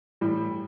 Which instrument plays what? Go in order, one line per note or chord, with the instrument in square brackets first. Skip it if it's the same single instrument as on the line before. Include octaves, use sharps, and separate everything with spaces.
[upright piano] A2 E3 G3